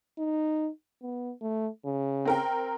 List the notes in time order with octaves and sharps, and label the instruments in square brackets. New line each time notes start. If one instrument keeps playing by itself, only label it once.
[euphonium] D#4
B3
A3
C#3
[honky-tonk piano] C4 A#4 G5